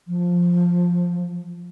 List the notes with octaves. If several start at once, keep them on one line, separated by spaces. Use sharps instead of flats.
F3